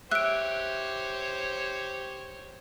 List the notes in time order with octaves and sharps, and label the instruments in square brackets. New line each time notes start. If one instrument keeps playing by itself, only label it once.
[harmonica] G4 C#5 [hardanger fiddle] C5 [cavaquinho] E5 [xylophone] F#6 D7